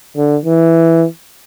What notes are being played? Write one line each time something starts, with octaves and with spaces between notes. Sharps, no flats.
D3
E3